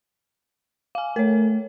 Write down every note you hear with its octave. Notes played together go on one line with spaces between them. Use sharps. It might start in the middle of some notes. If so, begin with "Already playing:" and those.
F5 G#5
A3 A#4 C#5